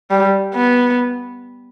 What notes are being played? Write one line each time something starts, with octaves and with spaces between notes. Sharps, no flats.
G3
B3